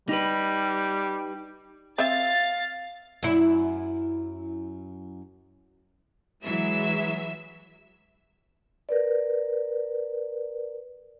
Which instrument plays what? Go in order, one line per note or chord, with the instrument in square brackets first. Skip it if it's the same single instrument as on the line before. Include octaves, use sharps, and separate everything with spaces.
[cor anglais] G3 [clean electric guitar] D#4 G4 B4
[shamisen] C4 E5 [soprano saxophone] F5 [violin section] A6
[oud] F#2 E4
[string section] E3 F#3 G#3 E5 E6
[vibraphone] A#4 B4 D5